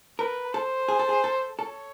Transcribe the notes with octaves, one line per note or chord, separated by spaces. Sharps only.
A#4 B4
A4 C5
G#4
A4
G#4
A4
A4 C#5